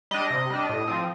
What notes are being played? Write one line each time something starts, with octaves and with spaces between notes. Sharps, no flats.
G3 D4 D#5
C3
G3 D4
A2
F3 C4